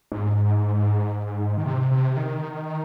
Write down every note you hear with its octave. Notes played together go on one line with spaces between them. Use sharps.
G#2
D#3
C3
C3
D#3